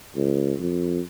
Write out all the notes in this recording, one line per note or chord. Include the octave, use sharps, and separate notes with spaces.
C#2
F2